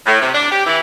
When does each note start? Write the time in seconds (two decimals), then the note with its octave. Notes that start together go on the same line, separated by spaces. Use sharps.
0.07 A2
0.21 C3
0.34 D4
0.51 G4
0.66 E3